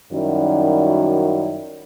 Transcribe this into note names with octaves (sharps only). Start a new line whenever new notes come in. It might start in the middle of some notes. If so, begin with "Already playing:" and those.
F#2 D#3 G3 C#4 E4 F#4